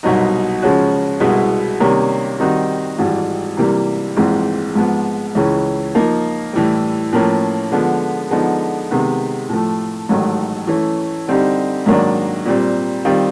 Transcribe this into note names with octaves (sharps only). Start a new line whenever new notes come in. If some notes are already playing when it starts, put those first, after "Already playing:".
C2 B2 F#3 B3 D#4
C#3 F3 G#3 C#4 F#4
C2 B2 G#3 B3 E4
C3 D#3 G3 A#3 C#4
D#3 G3 C4 D#4 F#4
G#1 G#2 E3 G3
C3 E3 G3 A#3
A#1 G#2 E3 G#3 C4
G#2 F3 G#3 B3
C#2 C#3 E3 G#3 C#4
F3 A#3 D#4
A2 E3 G3
A2 F3 A#3 C#4
D3 F3 G#3 B3
D3 F3 G#3 B3 D#4
C3 D#3 G#3 B3
A2 F3 A3
A1 G#2 D#3 F#3 A3
E3 A3 C#4
D3 G3 C4 D#4 G4
G#2 D#3 F#3 A#3 D4
A#2 G3 C4
D#3 G3 C4 F4